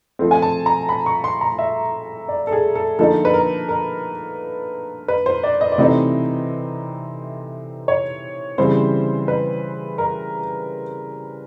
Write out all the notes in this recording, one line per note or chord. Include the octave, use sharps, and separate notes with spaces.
F3 A3 C4
G#5
A5
A#5
B5
C#6
C6
A#5
E5
D5
A4
G#4
A4
D3 F3 A#3 D#4 A4
B4
A#4
A#4
B4
C5
D5
D#5
D5
C3 E3 A3 C4 D#4 D#5
C#5
C#3 E3 G3 C4 C5
B4
A#4